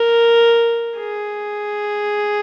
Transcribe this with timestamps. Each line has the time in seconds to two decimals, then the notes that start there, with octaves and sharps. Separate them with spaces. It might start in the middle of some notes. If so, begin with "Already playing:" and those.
Already playing: A#4
0.97 G#4